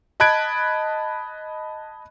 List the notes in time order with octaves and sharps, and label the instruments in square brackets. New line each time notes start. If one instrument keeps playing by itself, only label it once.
[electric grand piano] D#5 A5 B5 F#6 G#6 D7